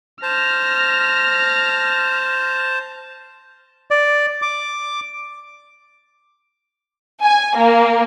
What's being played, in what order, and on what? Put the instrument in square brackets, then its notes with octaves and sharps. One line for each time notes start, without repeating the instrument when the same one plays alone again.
[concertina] C5 A5 [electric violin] F6 A#6
[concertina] D5
D6
[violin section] G#5
A#3